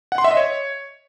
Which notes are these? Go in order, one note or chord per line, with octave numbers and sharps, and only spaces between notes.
F#5
C6
E5
D#5
C#5